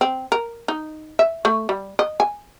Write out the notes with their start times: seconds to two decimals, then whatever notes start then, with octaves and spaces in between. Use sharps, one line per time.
0.01 C4
0.32 A#4
0.68 D#4
1.19 E5
1.45 A3
1.69 G3
1.99 D#5
2.20 G#5